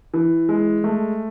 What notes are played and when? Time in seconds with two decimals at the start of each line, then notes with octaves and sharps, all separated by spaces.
0.14 E3
0.49 G#3
0.84 A3